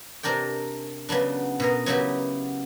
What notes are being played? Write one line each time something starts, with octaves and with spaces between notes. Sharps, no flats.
C3 D4 A#4 D5 G5
C#3 F#3 B3 D4
B2 G#4 A#4
C#3 F#3 B3 E4 F#4 G4